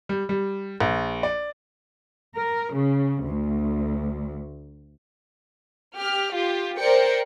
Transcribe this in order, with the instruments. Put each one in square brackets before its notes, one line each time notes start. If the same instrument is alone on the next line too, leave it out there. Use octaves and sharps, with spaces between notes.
[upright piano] G3
G3
A#1
D5
[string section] A#4
C#3
D2
[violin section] G4 F6
F4 G4
A#4 C5 D5 G5 C#7